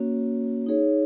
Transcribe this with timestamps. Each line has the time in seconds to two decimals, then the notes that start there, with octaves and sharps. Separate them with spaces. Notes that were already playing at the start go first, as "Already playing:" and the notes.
Already playing: A#3 C#4 F#4 C#5
0.66 D#4 G#4 C#5